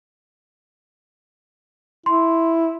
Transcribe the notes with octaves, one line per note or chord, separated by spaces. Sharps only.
E4 C6